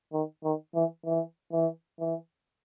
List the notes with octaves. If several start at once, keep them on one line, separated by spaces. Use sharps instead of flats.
D#3
D#3
E3
E3
E3
E3